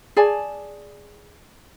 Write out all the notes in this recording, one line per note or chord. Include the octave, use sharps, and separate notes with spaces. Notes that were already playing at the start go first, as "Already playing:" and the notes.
G#4 D5 G#5 A5